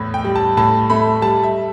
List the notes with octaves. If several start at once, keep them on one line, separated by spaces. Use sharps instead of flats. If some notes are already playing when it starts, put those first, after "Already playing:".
Already playing: E2 A2
G5
G3
A5
A2 A5
A3 B5
G3 A5
E5